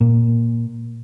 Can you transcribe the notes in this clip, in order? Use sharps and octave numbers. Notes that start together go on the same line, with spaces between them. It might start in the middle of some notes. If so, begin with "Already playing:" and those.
A#2